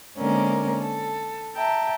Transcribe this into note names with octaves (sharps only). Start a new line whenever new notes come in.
D3 G#3 A#3 C4 C#4 A#4
A4
E5 G5 A5 A#5